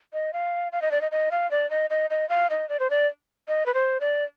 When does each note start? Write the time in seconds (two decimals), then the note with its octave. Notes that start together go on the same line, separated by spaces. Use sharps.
0.13 D#5
0.33 F5
0.72 F5
0.82 D#5
0.91 D5
1.01 D#5
1.12 D#5
1.31 F5
1.51 D5
1.70 D#5
1.90 D#5
2.10 D#5
2.29 F5
2.50 D#5
2.69 D5
2.80 C5
2.90 D5
3.48 D#5
3.66 B4
3.74 C5
4.01 D5